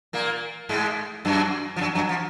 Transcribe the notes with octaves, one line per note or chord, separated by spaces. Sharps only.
A#2 A#3
G#2 G#3
F#2 F#3
F3
F#2 F#3
F#2 F#3
F3